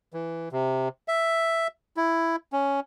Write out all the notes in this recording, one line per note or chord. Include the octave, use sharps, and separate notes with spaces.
E3
C3
E5
E4
C#4